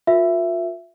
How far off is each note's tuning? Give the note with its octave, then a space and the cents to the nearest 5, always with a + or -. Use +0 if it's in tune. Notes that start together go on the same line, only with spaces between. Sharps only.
F4 +35 A#4 +0 E5 +15